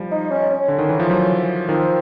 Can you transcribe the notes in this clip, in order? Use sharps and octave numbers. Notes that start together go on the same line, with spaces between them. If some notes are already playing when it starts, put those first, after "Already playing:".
Already playing: F3 G3
D#4
C#4
C#4
D3
D#3
E3
F3
E3 F#3
D#3 F3 C4